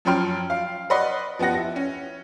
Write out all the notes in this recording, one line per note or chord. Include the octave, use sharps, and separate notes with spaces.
F#2 F3 C#4 G5 C6 F6
F5
B4 D5 D#5 F#5 C6
F3 B3 G4 F#5 A#6
E4 A#6
C#4